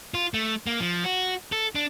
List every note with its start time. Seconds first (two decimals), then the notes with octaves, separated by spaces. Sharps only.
0.14 F4
0.34 A3
0.67 A#3
0.80 F3
1.04 F#4
1.52 A4
1.75 D4